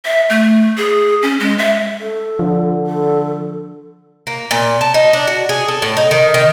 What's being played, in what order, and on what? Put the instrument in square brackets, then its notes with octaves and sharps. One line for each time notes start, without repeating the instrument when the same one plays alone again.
[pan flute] E5
A3
G#4
C#4
G#3
E5
[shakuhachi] A4
[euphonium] D3 [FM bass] F3
[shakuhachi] A4
[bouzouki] A#3
A#2
A5
D#4
D4
F#4
G#4
A4
A2
D#4
D#3
D#3